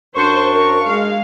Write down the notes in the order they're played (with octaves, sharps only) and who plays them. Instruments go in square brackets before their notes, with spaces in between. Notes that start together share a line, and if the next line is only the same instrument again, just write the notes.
[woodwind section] F#2 D4 C#6 [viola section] C5
[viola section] A#4
G#3 F5